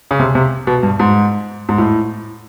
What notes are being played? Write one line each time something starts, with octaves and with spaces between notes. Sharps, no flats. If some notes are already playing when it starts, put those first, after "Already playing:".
C#3
C3
C3
B2
G2
G#2
G#2
A2